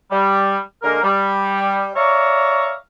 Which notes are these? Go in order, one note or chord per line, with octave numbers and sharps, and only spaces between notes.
G3
D3 G#3 A#3 A#4
G3
C#5 D5 E5 F5 A#5 C#6